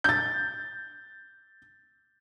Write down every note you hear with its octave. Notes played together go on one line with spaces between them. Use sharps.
G6 A6